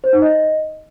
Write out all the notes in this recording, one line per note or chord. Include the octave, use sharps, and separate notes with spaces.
C5
D#4
D#5